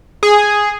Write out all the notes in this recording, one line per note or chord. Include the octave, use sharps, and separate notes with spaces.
G#4